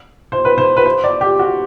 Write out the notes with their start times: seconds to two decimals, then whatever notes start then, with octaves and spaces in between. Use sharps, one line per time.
0.32 C5
0.45 B4
0.58 C5
0.77 B4
0.86 C5
1.04 D5
1.21 G4
1.39 F#4